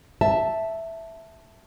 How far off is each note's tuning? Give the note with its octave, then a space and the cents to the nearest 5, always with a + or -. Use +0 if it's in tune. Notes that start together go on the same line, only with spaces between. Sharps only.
E5 +0 A5 +0